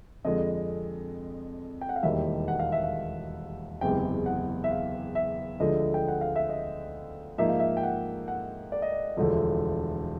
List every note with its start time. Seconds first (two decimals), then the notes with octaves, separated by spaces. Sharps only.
0.25 F2 D3 F3 G#3 D#5
1.81 G5
1.89 F#5
1.96 F5
2.03 E1 D#2 D#3 G3 E5
2.48 F#5
2.59 F5
2.72 E5
2.84 F5
3.81 F#1 E2 C3 E3 G#3 G5
4.26 F#5
4.64 E5
4.71 F5
5.15 E5
5.60 D2 D3 F3 G#3 D#5
5.94 G5
6.08 F#5
6.21 F5
6.36 E5
6.50 D#5
7.38 G#2 F3 A#3 D#4 E5
7.49 F5
7.60 E5
7.77 G5
7.83 F#5
8.28 F#5
8.72 D5
8.82 D#5
8.92 D5
9.17 E1 D2 D3 F3